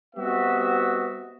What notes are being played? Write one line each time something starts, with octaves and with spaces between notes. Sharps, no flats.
G3 B3 C4 F#4 D#5 E5